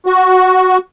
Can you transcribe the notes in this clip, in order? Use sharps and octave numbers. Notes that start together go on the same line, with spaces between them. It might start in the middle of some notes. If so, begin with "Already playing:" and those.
F#4